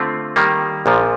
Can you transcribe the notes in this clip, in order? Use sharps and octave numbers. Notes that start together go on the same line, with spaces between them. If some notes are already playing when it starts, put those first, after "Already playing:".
Already playing: D3 A3 C4 F4
D#3 G3 A#3
A#1 A#2 F3